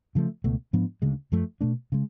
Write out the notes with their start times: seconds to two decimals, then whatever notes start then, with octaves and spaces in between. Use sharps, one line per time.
0.15 C#3 F3 A3
0.44 C#2 B2 A3
0.73 G#2 F3 B3 D4
1.02 D2 C#3 G#3
1.32 F#2 F3 A3
1.61 B2 A3 D4
1.92 C#3 G#3